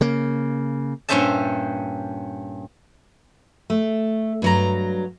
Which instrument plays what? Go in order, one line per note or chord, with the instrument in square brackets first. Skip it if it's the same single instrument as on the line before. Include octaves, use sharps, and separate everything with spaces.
[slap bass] C#3 A#3
[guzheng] G2 A#2 C#4 C5 E5 A5
[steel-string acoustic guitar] A3
G2 F#3 A#5